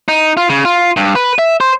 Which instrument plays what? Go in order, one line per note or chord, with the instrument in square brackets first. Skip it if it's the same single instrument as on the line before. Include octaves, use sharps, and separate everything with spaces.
[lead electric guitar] D#4
F4
C#3
F4
G2
B4
E5
C5